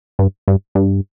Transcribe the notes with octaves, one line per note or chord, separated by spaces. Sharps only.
G2
G2
G2